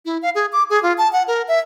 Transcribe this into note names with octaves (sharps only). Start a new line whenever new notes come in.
E4
F5
G#4
D6
G#4
F4
A5
F#5
A#4
E5